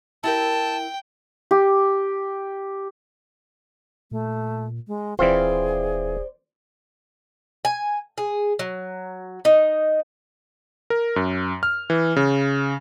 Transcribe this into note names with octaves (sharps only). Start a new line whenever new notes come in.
E4 G4 A#4 G5 A5
G4
A#2 A3
G#3
D#1 E3 C4 F4 G#4 C5 D5
G#5
G#4
F#3
D#4
A#4
F#2
F6
E3
C#3